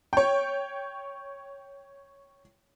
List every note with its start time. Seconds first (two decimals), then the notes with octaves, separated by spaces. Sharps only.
0.13 C#5 G5